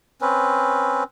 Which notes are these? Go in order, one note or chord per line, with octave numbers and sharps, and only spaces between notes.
C4 C#4 B4